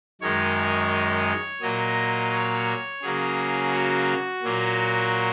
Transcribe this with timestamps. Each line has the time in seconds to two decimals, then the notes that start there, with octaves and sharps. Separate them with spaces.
0.21 F#2 D#3 G#3 C#5
1.62 A#2 F#3 A#3 D#5
2.32 C#5
3.02 C#3 F#3 A#3 G#4
3.72 F#4
4.43 A#2 F#3 A#3